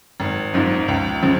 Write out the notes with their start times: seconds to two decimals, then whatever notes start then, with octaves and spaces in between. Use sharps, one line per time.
0.20 G#1
0.54 G#2 F3
0.88 C#2
1.23 C#3 F3